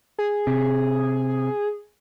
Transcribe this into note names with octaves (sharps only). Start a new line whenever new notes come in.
G#4
C3